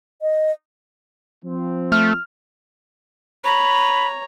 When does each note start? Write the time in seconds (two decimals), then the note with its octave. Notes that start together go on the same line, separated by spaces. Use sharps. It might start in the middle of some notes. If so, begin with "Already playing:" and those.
0.22 D#5
1.44 F3 C4
1.92 A3 F6
3.44 C#5 A#5 B5